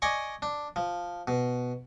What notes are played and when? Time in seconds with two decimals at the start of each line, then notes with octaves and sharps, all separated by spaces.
0.02 D5 D#5 G#5 C#6
0.42 D4
0.76 F3
1.27 B2